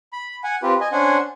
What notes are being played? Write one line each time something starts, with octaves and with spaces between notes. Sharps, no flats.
B5
F#5 G#5
C4 F4 G4 B4
D#5 G#5
C#4 D4 C5 F#5 G#5